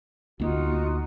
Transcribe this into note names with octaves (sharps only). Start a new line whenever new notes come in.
D2 A#3 D#4 F4 F#4